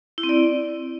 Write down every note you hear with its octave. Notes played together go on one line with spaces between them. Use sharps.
E4
C4
D5